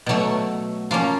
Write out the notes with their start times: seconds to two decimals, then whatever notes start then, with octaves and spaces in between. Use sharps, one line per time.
0.06 B2 F#3 A3
0.91 F3 A#3 C#4